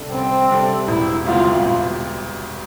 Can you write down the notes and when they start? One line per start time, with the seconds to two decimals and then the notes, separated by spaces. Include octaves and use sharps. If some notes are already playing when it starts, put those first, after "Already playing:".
Already playing: C2 C3 G3 D4 A4
0.12 C2 C4
0.50 C3 G3 D4 A4
0.88 E1 E4
1.26 D2 C3 G3 B3 F4
1.66 E1